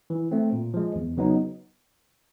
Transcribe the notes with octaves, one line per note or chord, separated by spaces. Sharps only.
E3
A3 C4
A#2
F3 G#3
E2
C#3 F#3 B3 D#4